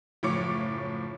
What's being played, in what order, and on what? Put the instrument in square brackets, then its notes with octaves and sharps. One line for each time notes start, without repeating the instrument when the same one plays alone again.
[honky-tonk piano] F#1 A2 F3 C#5 D6 C#7